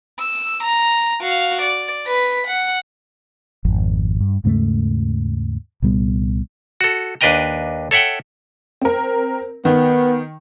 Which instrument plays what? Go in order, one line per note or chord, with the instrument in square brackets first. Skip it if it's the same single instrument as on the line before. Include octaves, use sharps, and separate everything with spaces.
[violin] E6
A#5
F#4 F5
D5
B4 B6
F#5
[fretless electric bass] G#1 F2
G2
D#2 G#2 C#3 A3
C2 A#2 G3 B3
[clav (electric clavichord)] F#4 A4
D#2 D4 B4 D#5 G5 A#5
A4 C#5 E5 F#5 G5
[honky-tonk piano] C4 A#4
[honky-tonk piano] D#3 [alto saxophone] B3